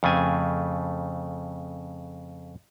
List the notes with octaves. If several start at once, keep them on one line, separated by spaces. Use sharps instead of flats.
F2 C#3 A3 G#5